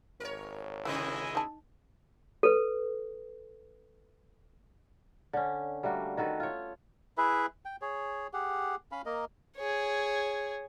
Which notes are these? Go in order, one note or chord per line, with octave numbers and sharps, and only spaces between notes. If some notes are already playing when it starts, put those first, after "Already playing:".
G#1 A#4 C#5
G#2 C3 D#3 E3 E4 G#4 D#5
D#4 A5
A4 B4
D3 C#4
G3 A3 A#3 F#4
D#3 F#4 A4 B4
F4 C#5
E4 G#4 B4 E5
G5
G#4 C#5
G4 G#4 F#5
C#4 F5 B5
A#3 A#4 D#5
G#4 C#5